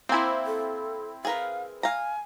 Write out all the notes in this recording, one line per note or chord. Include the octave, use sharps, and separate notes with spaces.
A#3 C4 E4 G#5
A4
G#4 A#4 B4 F5
F5 G#5 A#5